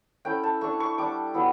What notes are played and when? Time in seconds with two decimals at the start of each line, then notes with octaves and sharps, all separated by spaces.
0.25 A3 C#4 E4 G5
0.43 A5
0.61 A3 D4 C#6
0.80 C#6
0.98 G3 D4 D6
1.34 F#3 B3 E4